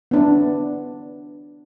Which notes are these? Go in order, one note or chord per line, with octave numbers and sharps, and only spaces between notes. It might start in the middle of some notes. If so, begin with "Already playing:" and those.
B3 D4